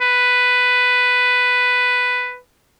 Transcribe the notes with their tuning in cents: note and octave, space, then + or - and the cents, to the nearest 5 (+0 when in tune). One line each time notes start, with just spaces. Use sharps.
B4 +5